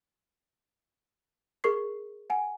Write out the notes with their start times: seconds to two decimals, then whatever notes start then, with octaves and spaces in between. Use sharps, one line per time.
1.64 G#4 A#4 C#6 C7
2.30 F#5 G#5